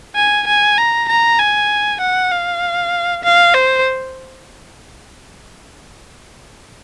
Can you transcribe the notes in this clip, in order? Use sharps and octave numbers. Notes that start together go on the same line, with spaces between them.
G#5
G#5
A#5
A#5
G#5
F#5
F5
F5
C5